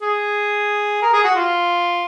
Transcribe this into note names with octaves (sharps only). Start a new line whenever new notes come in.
G#4
A#4
G#4
F#4
F4